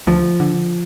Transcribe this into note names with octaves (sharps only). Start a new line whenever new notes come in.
D2 F3
D3